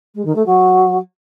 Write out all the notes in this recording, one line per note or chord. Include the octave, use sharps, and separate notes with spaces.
G#3
D#3
A3
F#3